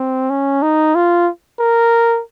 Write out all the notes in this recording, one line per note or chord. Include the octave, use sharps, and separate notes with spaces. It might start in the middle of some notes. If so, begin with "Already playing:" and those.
Already playing: C4
C#4
D#4
F4
A#4